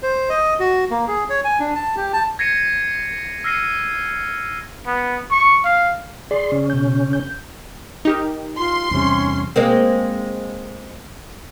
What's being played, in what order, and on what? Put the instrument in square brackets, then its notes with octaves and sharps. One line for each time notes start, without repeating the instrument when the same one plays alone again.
[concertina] C5
D#5
F#4
A#3
G#4
C#5
G#5
D4
A5
G4
A5
[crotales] G#6 A#6 C7 C#7 D#7
E6 F6 A#6 C7 C#7 D#7
[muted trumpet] B3
C#6
F5
[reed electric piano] G#4 D5 [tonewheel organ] C6
[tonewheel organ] C#3 C#4
[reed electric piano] B2 G6
G6
[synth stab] D#4 G4 A#4
[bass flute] F4 [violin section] C6
[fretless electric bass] E2 C3 G3 [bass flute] C#4
[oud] G#3 A#3 C4